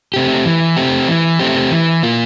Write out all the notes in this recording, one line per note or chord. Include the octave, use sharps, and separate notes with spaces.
A3 C4 G4
E3
A3 C4 G4
E3
A3 C4 G4
E3
A#3 F4